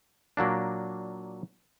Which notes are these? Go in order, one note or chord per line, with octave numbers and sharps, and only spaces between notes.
A#2 F#3 A#3 D4